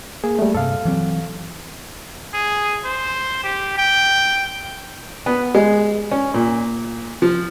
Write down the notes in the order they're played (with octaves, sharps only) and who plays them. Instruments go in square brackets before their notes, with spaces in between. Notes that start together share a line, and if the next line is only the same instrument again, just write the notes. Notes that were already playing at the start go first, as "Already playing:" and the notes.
[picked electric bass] A#3 [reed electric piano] G#4
[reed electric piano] G3 A3
[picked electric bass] G2 C3 [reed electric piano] A4 F5
[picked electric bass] E3 F#3 C4
[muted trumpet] G#4
C5
G4
G5
[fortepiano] B3
G#3
C#4
A#2
F3